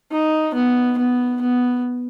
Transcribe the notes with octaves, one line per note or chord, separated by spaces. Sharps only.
D#4
B3
B3
B3